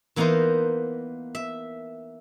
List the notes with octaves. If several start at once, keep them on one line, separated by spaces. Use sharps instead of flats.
E3 A#3 B3 D#4 A#4 C5
E5